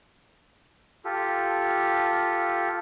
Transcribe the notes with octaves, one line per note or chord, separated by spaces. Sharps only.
F4 G4 A4